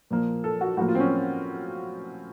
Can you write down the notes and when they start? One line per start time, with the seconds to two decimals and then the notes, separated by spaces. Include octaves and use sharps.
0.11 A#2 F3 A#3
0.44 A4
0.61 F#4
0.77 A2 F3 A#3 F#4
0.88 F4
0.95 C4
1.00 C#4